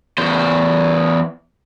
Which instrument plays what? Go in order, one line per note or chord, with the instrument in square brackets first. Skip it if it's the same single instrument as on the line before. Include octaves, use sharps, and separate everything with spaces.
[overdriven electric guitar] E2 C5